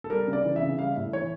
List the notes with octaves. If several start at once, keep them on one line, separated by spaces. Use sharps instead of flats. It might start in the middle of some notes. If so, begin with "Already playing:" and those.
A4
G3 A#4
C#3
D5
E3
E5
C#3
G3 F5
A2 E5
E3 C#5